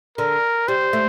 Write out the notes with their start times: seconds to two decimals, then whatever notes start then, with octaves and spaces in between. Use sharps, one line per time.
0.18 D3 A#4
0.68 G3 C5
0.93 A3